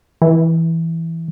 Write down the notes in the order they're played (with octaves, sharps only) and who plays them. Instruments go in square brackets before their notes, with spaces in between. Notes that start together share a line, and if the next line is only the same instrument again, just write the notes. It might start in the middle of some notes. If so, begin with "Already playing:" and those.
[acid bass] E3